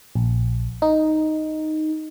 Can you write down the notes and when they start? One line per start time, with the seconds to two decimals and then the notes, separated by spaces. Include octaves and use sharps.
0.15 A#1
0.82 D#4